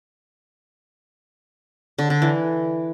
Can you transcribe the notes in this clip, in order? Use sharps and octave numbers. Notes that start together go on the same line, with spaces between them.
D3
D3
E3